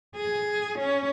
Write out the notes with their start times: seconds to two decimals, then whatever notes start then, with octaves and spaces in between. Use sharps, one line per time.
0.16 G#4
0.78 C#4